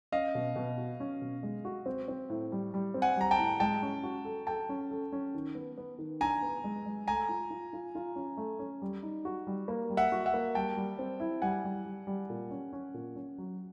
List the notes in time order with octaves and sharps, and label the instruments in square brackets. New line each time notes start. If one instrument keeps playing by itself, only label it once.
[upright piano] C#4 [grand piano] D#5 F5
[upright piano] B2
B2
F#4
C#4
B2
G#3
F#4
C4
C4
A2
G3
G3
C4
[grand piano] F#5 G#5
[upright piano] G3 [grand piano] A#5
[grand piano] G5 A5
[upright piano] A2
[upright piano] G#3 [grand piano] G5 A5
[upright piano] C#4
F#4
A4
[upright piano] A4 [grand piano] G5 A5
[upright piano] C#4
A4
C#4
D#3
B3
B3
D#3
[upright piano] D4 [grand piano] G#5 A#5
[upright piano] B3
G#3
G#3
[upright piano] A3 [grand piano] G#5 A#5
[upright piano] F4
F4
F4
F4
C#4
A3
C#4
G3
D#4
F#4
G3
A#3
G3
[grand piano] E5 F#5
[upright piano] F#4
[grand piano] E5 F#5
[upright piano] A#3
[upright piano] G3 [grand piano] G5 A5
[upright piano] G3
C4
E4
[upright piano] G3 [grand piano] F#5 G#5
[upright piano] G3
G3
G3
A#2
C#4
C#4
A#2
C#4
F#3